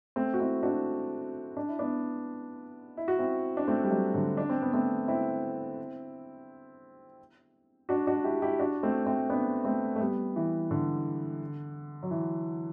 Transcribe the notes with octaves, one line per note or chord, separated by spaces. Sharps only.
A3 C4
F#4
C4 E4
D4 F#4
D4
E4
B3 D4
E4
F#4
C4 E4
D4
A3 C4
G3
F#3 A3
D3 F#3
D4
C4
B3
A3 C4
C4 E4
D4 F#4
D4 F#4
E4 G4
E4 G4
D4 F#4
A3 C4
A3 C4
B3 D4
A3 C4
A3
G3 B3
E3
D3
F#3
E3